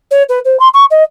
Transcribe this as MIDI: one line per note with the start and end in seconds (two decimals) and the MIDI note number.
0.11 0.23 73
0.29 0.39 71
0.45 0.59 72
0.60 0.68 84
0.74 0.85 85
0.91 1.03 75